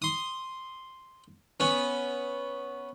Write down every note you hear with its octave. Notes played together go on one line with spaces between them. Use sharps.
C6 D#6
B3 C#4